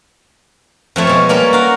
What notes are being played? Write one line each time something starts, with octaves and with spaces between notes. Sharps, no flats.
F2 F3 A3 C#5
B2 G#3
G3 A#3 C#4 C#5
F#4 A#4 F5